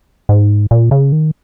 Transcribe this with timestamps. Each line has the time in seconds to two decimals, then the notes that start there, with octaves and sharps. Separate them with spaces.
0.29 G#2
0.71 A#2
0.91 C#3
1.12 D#3